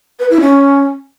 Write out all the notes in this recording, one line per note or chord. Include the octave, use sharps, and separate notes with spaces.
B4
E4
C#4